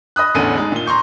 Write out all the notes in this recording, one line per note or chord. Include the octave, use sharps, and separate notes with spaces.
D#5 B5 D#6 F#6
A1 E2 D3 C#4 A4 D#7
G#3 D#4 G#4
A#2 G7
A#5 C6 C#6 G6